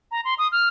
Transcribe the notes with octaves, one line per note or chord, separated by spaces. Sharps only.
A#5
C6
D#6
F6